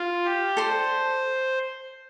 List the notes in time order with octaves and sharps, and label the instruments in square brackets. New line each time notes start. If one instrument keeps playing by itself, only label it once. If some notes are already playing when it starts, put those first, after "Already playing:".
Already playing: [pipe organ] F4
G4
[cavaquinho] A4 D5 A5 C6 [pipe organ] C5